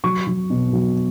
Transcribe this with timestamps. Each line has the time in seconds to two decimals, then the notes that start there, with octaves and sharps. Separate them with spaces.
0.04 F#3 C#6
0.27 F#3
0.50 B2
0.73 F#3